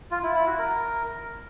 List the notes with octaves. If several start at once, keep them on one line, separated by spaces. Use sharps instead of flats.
F4
E4
E4
F#4
A#4